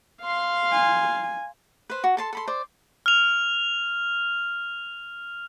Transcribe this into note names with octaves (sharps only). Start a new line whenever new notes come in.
F5 C6
G#5
B4 C5
F#4
A4 A5 C6
A4 B5 C6
C5 D5
F6 F7